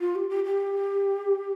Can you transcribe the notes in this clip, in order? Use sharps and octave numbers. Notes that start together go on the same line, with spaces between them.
F4
G4
G4
G4